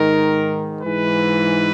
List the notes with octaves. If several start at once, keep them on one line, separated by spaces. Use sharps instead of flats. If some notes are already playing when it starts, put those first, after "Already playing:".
Already playing: G#2 D#3 A#4
G#2 E3 B4